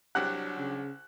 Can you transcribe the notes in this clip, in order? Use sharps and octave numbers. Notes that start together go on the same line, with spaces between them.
C2 F#3 D4 G4 F#5 F#6
C#3